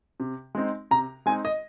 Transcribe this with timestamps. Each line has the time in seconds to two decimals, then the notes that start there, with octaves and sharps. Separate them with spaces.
0.20 C3
0.55 G#3 C4 D#4
0.91 C3 A#5
1.26 G#3 C4 D#4 G#5
1.45 D#5